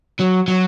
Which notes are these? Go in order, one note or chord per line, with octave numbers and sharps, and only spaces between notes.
F#3
F#3